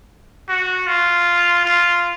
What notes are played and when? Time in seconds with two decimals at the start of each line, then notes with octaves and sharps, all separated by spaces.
0.49 F#4
0.87 F4
1.65 F4